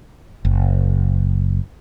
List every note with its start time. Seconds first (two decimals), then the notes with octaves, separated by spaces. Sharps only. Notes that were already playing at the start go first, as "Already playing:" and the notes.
0.45 F#1